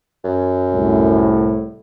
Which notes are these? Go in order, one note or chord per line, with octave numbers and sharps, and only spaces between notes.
F#2
C2 A2